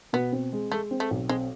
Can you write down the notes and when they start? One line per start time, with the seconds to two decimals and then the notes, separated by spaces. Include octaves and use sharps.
0.13 B2 B3
0.32 C4
0.53 G#3
0.72 G#3 A3
0.91 C4
1.00 A3
1.11 B1
1.29 G#3 C4